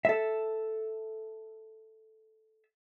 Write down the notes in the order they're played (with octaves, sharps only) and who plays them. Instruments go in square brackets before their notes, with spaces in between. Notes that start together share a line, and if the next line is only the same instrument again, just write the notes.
[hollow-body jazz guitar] A4 E5